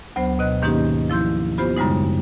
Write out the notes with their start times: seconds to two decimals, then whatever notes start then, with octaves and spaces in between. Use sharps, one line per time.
0.16 D2 F#3 B3 C5
0.39 B2 D#5 F#6
0.62 G#2 D#3 A#3 C#4 D#4 G4
1.10 F3 E4 C6 G6
1.58 B3 F4 G4 C5 B5
1.77 F#2 C#3 G3 G#3 D#4